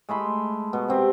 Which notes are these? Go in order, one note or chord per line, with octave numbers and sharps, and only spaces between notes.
G#3 A3 B5 C6
B2
C3 C4 G4